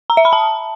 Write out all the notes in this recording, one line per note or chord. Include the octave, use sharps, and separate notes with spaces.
A#5
E5
B5
A5